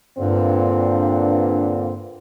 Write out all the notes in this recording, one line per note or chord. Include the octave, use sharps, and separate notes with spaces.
G2 A#2 D3 C4